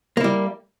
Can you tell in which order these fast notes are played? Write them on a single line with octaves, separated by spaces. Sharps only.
A#3 E4 G3